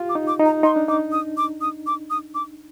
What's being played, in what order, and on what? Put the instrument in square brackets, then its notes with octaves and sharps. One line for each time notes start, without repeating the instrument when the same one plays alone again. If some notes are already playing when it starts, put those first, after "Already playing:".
Already playing: [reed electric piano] F4 G4
[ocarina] D6
[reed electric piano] D#4
[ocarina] D6
[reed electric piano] D#4
[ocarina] A#5
[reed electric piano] D#4 [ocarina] C6
[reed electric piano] D4
[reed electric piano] D#4 [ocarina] D6
[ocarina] D#6
D6
D#6
D6
D#6
D6